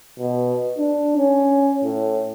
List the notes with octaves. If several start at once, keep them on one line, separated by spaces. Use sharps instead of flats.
B2
D4
C#4
A2